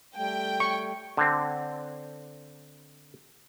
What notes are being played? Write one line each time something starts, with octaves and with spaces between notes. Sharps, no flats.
G3 A3 G5
C#6
D3 C4